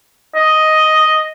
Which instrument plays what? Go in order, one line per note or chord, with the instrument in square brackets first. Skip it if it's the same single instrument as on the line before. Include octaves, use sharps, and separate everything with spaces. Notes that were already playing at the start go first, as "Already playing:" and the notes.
[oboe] D#5